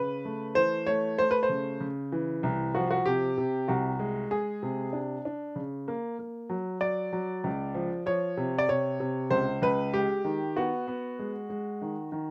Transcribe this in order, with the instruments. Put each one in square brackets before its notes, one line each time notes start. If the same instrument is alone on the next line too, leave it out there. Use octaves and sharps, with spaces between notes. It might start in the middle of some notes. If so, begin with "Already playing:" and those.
Already playing: [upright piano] C#3 [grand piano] B4
[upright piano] A3
[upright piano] E3 [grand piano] C5
[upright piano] A3 [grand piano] C#5
[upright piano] A3 [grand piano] C5
[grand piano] B4
C5
[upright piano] C#3
C#3
E3
C2
[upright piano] F3 [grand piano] F#4
[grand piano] F#4
[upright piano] C3 [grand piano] G4
[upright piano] C3
[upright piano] C2 [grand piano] F#4
[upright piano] G#3
[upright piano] G#3 [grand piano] G#4
[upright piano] C3
D4
D4
C#3
A#3
A#3
F#3
[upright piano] F#3 [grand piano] D5
[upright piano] F#3
C#2
F3
[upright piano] F3 [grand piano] C#5
[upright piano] C3
[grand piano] D5
[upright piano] C3 [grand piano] C#5
[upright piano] C3
[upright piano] C#2 [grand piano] C5
[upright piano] C#2 [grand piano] B4
[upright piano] G#3 [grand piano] G4
[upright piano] D#3
[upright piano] B3 [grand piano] F#4
[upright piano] B3
G#3
G#3
D#3
D#3